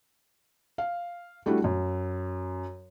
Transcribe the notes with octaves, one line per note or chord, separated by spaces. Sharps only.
F5
G3 A3 D4 E4 F#4
F#2